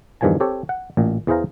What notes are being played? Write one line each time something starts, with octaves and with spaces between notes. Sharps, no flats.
E2 G2 D#3 F3 G#5 A5
C4 G4 A4 C#5
F#5
A1 A#2
E2 E3 G#4 C5 F5 A#5